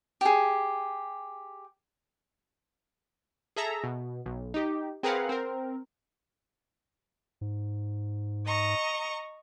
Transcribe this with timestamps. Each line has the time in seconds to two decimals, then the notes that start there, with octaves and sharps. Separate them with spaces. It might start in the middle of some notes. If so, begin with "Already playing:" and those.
0.21 G4 G#4
3.56 G#4 A4 E5 A#5
3.84 B2
4.26 B1
4.54 D#4 G4
5.03 C4 G#4 A#4 B4 F5 F#5
5.29 C4 A#4
7.41 G#2
8.47 D#5 A#5 C#6